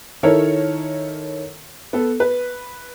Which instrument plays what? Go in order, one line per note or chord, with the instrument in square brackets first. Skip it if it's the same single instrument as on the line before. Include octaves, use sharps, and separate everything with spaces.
[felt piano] D#3 E4 A4 A#4 C#5
B3 A4
B4